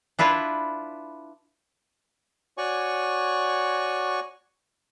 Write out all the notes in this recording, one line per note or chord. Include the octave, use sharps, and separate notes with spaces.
D4 E4 F4 B4
F#4 C#5 D5 G#5 C#6